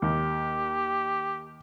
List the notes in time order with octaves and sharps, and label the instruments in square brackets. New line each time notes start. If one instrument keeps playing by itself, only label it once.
[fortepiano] D#2 [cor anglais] G4